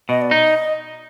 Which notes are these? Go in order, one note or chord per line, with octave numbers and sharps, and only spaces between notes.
B2 D#5
D5
D#4 D#5